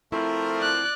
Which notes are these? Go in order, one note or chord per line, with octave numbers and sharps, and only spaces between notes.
F3 A3 C4 E4 A#4
D5 F#6